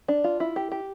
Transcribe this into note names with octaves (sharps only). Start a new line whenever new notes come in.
D4
F4
E4
G4
G4